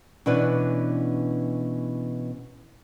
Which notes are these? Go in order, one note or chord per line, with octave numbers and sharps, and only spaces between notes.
B2 E3 C#4 D4 B4 D5